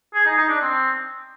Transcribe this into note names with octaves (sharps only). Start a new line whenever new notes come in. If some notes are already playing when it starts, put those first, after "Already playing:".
G#4
D#4
D#4
D4
C4